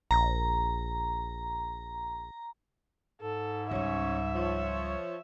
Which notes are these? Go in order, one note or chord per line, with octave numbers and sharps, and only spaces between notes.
A#1 A#5
G#2 A4
C#2 G3 C#4 C#5 E5
F3 C#5